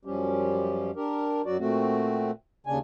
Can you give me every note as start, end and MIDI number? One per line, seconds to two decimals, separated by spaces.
0.05 0.91 42
0.05 0.91 53
0.05 0.91 55
0.05 0.91 61
0.05 0.91 67
0.96 1.42 62
0.96 1.42 67
0.96 1.42 70
1.45 1.57 42
1.45 1.57 54
1.45 1.57 66
1.45 1.57 74
1.59 2.31 46
1.59 2.31 57
1.59 2.31 60
1.59 2.31 66
2.67 2.79 39
2.67 2.79 49
2.67 2.79 62
2.67 2.79 80